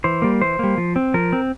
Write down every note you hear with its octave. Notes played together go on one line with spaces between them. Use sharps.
E3 C5
G3 A#3
E3 C5
G3 A#3
F3
C4
F3 A#4
C4